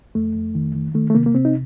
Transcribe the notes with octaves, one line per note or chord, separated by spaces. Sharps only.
F2 A3
F2
D#3
D#3
D#3 A3
A3
C3 A#3
A#3
C3 C4
D#4